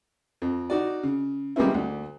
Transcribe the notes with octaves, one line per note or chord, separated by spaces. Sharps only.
F2
D#4 F#4 D5
C#3
G3 G#3 A#3 B3 C#4 E4
D2